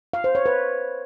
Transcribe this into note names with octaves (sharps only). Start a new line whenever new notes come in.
F5
C5
C#5
B4